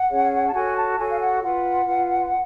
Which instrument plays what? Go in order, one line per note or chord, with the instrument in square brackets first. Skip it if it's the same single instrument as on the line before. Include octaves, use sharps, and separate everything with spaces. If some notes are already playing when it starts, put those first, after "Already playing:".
Already playing: [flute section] F#5
C#4 G#4 C#5
A5
F#4 A4 C#5 G#5
A5
F#4 A4 C#5 G#5
F5
F#5
F4 B4 F#5
F4 B4